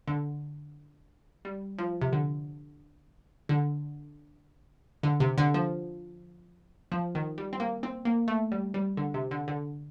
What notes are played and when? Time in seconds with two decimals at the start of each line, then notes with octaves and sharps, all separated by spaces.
0.08 D3
1.45 G3
1.78 F3
2.02 C3
2.13 D3
3.49 D3
5.03 D3
5.20 C3
5.38 D3
5.54 F3
6.92 F3
7.15 D#3
7.38 G3
7.53 C4
7.60 A#3
7.83 C4
8.05 A#3
8.28 A3
8.52 G3
8.74 G3
8.97 D3
9.14 C3
9.31 D3
9.48 D3